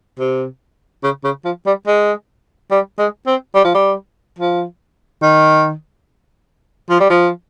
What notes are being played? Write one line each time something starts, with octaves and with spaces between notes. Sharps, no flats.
C3
C#3
C#3
F3
G3
G#3
G3
G#3
C4
G3
F3
G3
F3
D#3
F3
G3
F3